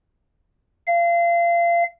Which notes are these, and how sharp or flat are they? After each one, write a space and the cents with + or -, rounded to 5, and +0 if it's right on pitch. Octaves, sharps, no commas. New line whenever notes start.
F5 -30